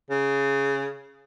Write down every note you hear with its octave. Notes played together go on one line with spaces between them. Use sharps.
C#3